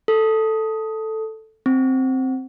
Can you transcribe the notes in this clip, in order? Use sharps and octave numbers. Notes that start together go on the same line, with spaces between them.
A4
C4